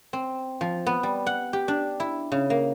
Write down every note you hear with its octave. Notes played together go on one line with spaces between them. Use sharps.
C4
F3
B3
G3
F#5
G4
D4
E4
C#3
A#3